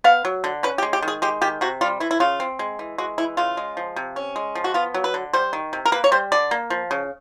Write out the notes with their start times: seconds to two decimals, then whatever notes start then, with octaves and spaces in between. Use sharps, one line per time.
0.04 B3 F5
0.25 F#3
0.44 D3
0.63 C#4 B4
0.78 G4
0.82 G#3
0.93 G4
1.02 D#3
1.08 G#4
1.22 G#3 G4
1.41 D#3 G4
1.61 C3 F#4
1.81 G3 F4
2.00 E3 E4
2.11 E4
2.20 C#3 F4
2.40 C4
2.59 G#3
2.79 E3
2.98 G#3 F#4
3.18 E3 E4
3.37 C#3 F4
3.57 G#3
3.77 F3
3.96 C3
4.16 C#4
4.36 G#3
4.55 F3
4.64 F#4
4.74 B3 F4
4.94 F#3
5.04 B4
5.14 D3
5.33 G3 C5
5.53 D#3
5.73 C3
5.85 A#4
5.92 A#3 B4
6.04 C#5
6.12 G3 C5
6.32 D3 D5
6.51 A#3
6.70 F3
6.91 C#3